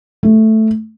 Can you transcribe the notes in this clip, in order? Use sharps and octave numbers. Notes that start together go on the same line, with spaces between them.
A3